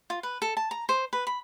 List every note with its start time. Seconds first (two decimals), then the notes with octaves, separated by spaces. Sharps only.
0.10 F4
0.23 B4
0.42 A4
0.57 A5
0.71 A#5
0.89 C5
1.13 B4
1.27 B5